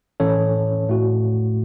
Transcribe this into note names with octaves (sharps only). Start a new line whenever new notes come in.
A2 E3 C#4 A4 C#5
A2 A3 F#4